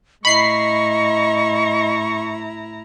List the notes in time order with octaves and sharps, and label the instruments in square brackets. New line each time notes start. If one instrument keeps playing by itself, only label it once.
[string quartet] A2 E4 A#5 [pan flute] D#5 [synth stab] B5 C7 [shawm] C#6